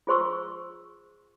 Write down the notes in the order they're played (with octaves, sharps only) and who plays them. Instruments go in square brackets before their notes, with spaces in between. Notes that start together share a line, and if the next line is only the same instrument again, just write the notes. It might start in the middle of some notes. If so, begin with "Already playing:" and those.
[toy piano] F4 G#4 C5 C6 C#6 E6